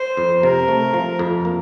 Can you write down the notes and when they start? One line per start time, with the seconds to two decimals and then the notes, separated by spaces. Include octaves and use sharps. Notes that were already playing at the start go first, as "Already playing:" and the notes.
Already playing: C5
0.17 F2
0.43 C3 A#4
0.68 A3
0.94 F3
1.19 F2
1.45 A#3